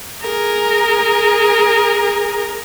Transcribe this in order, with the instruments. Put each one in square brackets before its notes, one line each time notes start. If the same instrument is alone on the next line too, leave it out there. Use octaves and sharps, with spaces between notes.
[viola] G#4 A#4